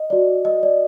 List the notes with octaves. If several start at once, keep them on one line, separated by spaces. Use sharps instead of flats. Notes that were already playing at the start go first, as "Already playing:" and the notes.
Already playing: D#5
F#4 D5
D#5
D5